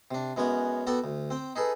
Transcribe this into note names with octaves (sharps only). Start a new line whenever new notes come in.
C3 D4
F#2 G#3 B3 C#4 C#5 F#5
B3 F#4 A4 D5 G5
D2
C4 G5
D#4 G#4 A4 B4